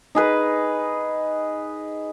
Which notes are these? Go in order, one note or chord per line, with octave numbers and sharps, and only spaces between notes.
D#4 G#4 B4